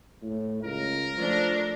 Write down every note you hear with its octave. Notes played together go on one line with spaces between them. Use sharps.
A2
C#2 A#4
F3 A3 D4